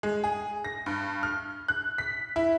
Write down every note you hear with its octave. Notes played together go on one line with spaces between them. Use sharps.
G#3
G#4
A#6
G2
F6
F#6
B6
E4